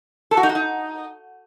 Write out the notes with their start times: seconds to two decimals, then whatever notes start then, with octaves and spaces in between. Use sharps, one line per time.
0.31 A4
0.37 F#4
0.43 D#4
0.49 F#4
0.55 D#4